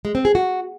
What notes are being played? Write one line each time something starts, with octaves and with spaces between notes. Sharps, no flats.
G#3
C4
G#4
F#4